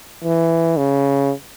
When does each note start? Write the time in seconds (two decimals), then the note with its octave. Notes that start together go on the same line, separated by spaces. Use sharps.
0.24 E3
0.77 C#3